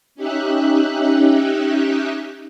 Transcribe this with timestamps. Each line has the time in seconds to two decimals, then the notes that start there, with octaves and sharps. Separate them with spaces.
0.15 C#4 D#4 G4 E5 F#6